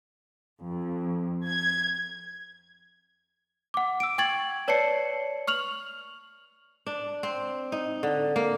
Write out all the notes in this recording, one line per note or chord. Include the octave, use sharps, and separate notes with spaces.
F2
G#6
F#5 D6
E6 D7
G5 C#6 G#6 A6 F#7
B4 C#5 D5 A5 C7 C#7
C#6 F6 F7 F#7
D4
C4
D#4
D3
A#3